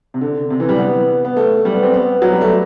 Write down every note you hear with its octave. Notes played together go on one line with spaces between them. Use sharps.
C3
D3
C3
E3
G3
B3
B3
A3
G3
B3
C4
B3
F#3
G3
A3